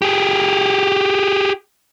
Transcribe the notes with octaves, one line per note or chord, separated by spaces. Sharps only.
G4 G#4